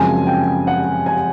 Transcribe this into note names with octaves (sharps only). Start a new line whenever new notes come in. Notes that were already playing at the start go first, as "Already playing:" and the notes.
Already playing: F#2 C#3 F3 G#3 C4 G#5
G5
F#5
G#5